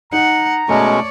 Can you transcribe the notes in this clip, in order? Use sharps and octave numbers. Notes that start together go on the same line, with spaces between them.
D#4 F#5 A#5
B2 G#3 A3 C#4 C#5 D5